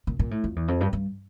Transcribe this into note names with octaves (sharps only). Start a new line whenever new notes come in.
A#2
A#2
A2
F2
E2
F2
G2
G2